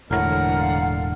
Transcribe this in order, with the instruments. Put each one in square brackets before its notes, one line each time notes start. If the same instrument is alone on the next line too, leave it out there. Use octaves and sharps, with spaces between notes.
[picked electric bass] E1 A2 [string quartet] D3 [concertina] A#4 [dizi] F#5
[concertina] F5